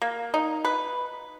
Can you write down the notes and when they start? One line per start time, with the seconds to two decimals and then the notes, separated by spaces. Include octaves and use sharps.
0.02 A#3
0.34 D#4
0.65 B4